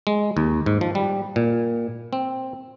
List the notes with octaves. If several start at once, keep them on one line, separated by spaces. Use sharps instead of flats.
G#3
D#2
G#2
F3
G3
A#2
C4